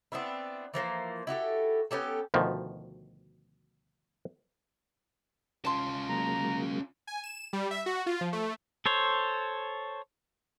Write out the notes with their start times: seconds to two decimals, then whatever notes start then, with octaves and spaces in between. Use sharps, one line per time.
0.12 B3 C4 D4 E4
0.74 E3 F3 A#3 C5
1.27 E4 F#4 G4 A4
1.91 B3 C#4 G4 A4
2.34 D2 B2 D#3 F3
5.65 C#4 F4 A5 C6
6.09 F#3 G#3 A#3 A#5
7.07 G#5
7.23 E7
7.53 G3
7.71 E5
7.86 F#4
8.06 F4
8.21 F3
8.33 A3
8.86 A4 C5 C#5